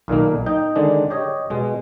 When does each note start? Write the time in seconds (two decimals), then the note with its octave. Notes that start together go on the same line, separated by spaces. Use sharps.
0.08 B1 A#2 D#3 A#3
0.46 D#4 D#5 G5
0.76 D3 D#3 G#3 D4
1.10 G4 C#5 D#5
1.50 B2 G#3